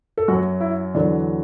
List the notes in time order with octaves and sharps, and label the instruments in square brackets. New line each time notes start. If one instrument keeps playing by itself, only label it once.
[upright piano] A4
F#2 F#3 F#4
E4
E2 D3 F#3 D4